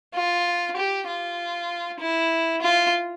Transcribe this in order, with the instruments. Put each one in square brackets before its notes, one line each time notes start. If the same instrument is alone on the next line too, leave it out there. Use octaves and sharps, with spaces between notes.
[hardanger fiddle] F4
G4
F4
E4
F4